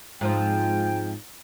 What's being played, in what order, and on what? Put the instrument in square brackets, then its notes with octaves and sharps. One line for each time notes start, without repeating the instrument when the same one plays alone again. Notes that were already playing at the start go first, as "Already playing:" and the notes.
[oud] G#2 F3 C4 [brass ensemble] G#3 F4 G5